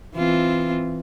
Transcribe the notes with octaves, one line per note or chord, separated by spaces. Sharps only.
E3 C4 F4